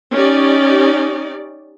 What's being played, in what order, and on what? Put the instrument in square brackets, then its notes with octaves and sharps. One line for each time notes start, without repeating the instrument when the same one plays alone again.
[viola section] C#4 D#4 G4 D5